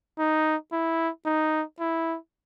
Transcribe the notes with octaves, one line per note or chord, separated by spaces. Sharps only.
D#4
E4
D#4
E4